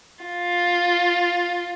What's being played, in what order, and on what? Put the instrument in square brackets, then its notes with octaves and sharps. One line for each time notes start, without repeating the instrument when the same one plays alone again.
[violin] F4